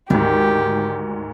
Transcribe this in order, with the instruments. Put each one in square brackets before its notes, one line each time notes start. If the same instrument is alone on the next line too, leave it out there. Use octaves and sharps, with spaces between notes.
[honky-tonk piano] D2 G#2 [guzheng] D#3 [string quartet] G4